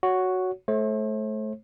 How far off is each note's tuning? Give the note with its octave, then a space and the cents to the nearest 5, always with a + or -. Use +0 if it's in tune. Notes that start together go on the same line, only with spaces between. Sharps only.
F#4 +0 C#5 +15
A3 -25 C5 +45